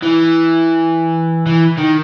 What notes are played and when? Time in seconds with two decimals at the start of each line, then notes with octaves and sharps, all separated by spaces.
0.02 E3
1.46 E3
1.78 D#3